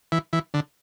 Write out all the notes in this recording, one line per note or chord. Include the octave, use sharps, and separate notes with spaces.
E3
E3
D3